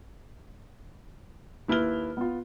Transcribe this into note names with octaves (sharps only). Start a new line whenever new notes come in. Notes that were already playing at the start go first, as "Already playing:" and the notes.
D#2 E4 B4 F6 G7
B3 F4